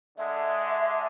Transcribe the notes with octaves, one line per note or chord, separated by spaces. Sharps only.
D3 G#3 E5